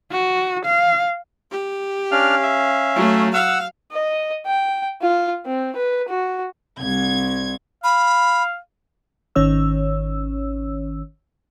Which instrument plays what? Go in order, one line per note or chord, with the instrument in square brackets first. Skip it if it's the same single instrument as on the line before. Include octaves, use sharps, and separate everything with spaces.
[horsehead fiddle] F#4
F5
[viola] G4
[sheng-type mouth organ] C#4 F5 [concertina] D4 F6
[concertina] E5
[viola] F#3 A3
[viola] F5 [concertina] F#5 E6
[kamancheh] D#5
G5
F4
C4
B4
F#4
[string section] C2 G#6
[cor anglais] F5 [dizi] B5
[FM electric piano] G#1 D#3 C#4 C#5 E6